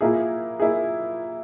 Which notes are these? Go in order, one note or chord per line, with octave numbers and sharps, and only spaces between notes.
A#2 A#3 E4 G#4
A#3 E4 G#4